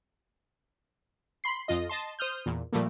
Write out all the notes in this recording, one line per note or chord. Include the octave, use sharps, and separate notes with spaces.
B5 C6 C7
F2 F4 D#5
D#5 A5 C6
C5 D#6 F6 G6
E2 A#2
A#2 F3 G3 A3 A#3